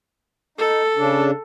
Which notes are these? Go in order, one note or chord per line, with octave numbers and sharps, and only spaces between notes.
D#4 A4
C#3 D4